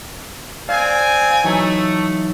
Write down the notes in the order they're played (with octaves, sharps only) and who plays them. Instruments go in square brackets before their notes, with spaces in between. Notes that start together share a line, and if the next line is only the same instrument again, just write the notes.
[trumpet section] C4 G#5 [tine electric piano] D5 F5
[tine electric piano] E3 F#3 D#4 [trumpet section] A3